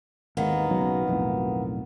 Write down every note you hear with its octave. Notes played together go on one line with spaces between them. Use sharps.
G#1 D#2 G#2 D#3 A#3 B3
B1 C#3 F#3
B1 F2 A2